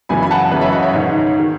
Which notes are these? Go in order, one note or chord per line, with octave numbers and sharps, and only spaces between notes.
F#2 C#3 E3 G#5 B5
B5
F#5 A5
F#2 C#3 E3 B4
C#5 E5
D#5 F#5
C#5 E5
G#2 D#3 C#5
D#3